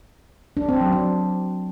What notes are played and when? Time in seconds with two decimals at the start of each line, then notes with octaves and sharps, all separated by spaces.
0.57 D4
0.69 C4
0.81 F#3
0.93 D4